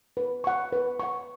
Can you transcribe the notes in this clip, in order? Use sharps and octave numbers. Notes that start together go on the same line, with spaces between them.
B4
F#5 C#6
B4
F#5 C#6